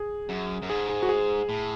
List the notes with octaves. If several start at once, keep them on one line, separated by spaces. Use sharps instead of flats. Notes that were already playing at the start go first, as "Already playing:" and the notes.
Already playing: G#4
F#2
F#2
G#2 G#4
G#4
F#4
G#4
A2